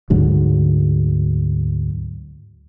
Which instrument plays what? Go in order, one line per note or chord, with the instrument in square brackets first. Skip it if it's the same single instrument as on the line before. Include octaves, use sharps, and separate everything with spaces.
[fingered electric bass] D2 G#2 D3 F#3